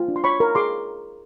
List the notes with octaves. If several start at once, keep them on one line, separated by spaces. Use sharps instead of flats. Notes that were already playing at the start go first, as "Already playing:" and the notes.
Already playing: F4
D4
C6
C#5 B5 C#6
A#4
G#4 C6 D6